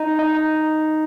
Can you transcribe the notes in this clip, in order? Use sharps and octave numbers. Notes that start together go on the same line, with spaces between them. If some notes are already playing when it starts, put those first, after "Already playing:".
Already playing: D#4
D#4